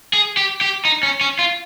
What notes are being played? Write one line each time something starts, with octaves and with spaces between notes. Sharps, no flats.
G#4
G4
G4
D#4
C#4
C#4
F4